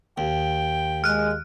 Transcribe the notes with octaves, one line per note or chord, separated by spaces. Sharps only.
D#2 G5
G#3 F6 F#6